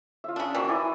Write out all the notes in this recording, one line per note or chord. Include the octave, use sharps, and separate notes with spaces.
F4 E5
C#3 D4
D#3 E3 F#4 C#6 E6
E4 D5 G#5